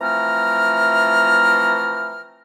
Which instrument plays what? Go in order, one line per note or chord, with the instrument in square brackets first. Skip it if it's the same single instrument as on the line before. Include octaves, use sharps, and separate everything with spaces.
[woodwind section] E3 F3 A3 C4 A#5 F6